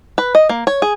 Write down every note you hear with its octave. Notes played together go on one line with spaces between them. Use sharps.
B4
D#5
A#3
C#5
G#4